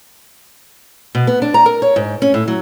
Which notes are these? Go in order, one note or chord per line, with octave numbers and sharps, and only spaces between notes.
B2
B3
D4
A#5
A#4
C#5
G#2
C#4
A2
F#3